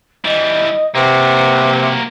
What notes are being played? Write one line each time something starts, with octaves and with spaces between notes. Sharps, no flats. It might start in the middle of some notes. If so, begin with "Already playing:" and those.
E3 G3 D#5
C3 A#3 F#4 B4